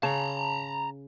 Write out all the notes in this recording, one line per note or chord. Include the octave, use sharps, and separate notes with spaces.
C#3 A5 A#5